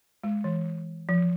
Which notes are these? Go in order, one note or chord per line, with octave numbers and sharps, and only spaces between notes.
G#3
E3
F3